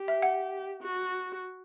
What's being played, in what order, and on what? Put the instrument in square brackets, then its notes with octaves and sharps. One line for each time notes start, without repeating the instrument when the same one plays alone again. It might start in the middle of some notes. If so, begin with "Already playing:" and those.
Already playing: [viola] G4
[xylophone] E5
F#5
[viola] F#4